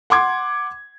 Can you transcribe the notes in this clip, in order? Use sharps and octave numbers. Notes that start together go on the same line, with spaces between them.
F#5 C6 D6 G#6